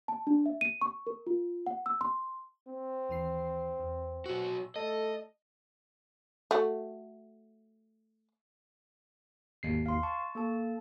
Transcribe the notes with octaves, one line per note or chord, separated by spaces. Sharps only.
A5
D4
E5
D#7
C#6
A#4
F4
F#5
E6
C6
C4
D#2 E3 C7
E2
B1 F#4 E6
A3 A4 D#5
A3 F#4
G#1 D#2 C7
F5 C6
A5 C#6
A#3 A4 A5